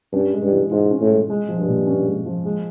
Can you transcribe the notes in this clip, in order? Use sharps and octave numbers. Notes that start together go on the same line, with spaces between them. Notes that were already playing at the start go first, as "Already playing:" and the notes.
G2 C#4
G#3
G2
E3
G#2 F4
C#4
A2
G#3
G#3
F3
G2
A#2
C#4
G#3
F3
G#3